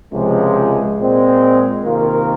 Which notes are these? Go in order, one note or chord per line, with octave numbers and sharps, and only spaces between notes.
C#2 C3 F3 G#3
A#2 G#3 C4
C3 D#3 A#3 F4 A#4